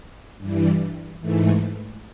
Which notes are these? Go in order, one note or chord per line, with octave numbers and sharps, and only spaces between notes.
G2 E3 G3
G#2 E3 A3